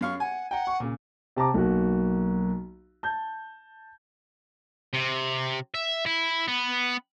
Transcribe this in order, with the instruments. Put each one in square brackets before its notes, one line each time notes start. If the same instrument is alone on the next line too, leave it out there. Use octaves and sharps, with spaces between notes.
[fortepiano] F#2 F5 C#6
[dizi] F#5 [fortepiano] G#5
[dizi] F#5 [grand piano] G5 A#5
[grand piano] C#6
A#2 C#3
C3 A5 A#5 D6
B1 A#3 F#4
A5 G6
[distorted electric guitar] C3
E5
E4
B3